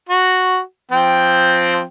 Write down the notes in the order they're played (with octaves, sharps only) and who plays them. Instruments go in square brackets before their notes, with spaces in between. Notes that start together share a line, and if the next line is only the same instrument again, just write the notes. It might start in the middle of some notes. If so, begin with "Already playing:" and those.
[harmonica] F#4
F3 C4 G5